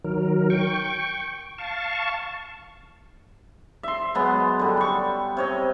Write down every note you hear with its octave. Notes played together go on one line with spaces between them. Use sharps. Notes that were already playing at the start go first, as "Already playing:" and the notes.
D#3 F#3 A#4
G5 C#6
F5 A5 C#6
E5 C6
F#3 G#3 B3
D3 G3
G5 C#6
C3 C#5 D#5